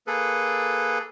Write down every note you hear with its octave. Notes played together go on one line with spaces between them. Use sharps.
A#3 G#4 A4 B4